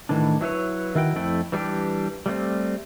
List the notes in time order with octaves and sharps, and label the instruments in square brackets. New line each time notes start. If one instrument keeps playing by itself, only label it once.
[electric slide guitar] A2 D#3 E3 D4
F#3 E4 B4 C#5
D#3 E4 F#4 G5
F2 A3 E4 G5
E3 G3 A3 D4 G4
G3 A3 A#3 C4